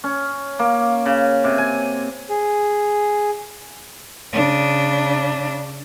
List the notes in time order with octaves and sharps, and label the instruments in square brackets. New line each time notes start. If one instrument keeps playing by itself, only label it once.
[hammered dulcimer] C#4
A#3
C#3
C3
G#5
[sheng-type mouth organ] G#4
[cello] C#3 D4